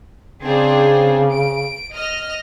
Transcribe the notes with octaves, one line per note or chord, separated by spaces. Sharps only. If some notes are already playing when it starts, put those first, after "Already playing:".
C#3 C4 D4 G#4
D7
D#5 F6